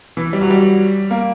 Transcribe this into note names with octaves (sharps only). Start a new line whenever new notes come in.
E3
G3
F#3
G3
A#3